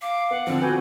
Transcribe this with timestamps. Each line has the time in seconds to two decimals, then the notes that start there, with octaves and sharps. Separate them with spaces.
0.02 F5 D6
0.31 B3 F#5
0.47 D3 F3 C4
0.62 B3 F#4 B4 G#5 G6